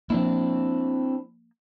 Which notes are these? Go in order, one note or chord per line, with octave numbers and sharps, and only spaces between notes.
F3 A#3 C4 D4 E4